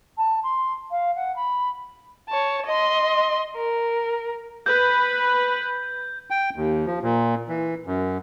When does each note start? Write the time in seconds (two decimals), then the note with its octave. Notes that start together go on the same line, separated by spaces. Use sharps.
0.18 A5
0.44 C6
0.91 F5
1.16 F#5
1.36 B5
2.30 C#5 A5
2.66 D#5 C6
3.56 A#4
4.66 B4 G6
6.30 G5
6.56 D#2
6.86 F3
7.03 A#2
7.49 E3
7.86 F#2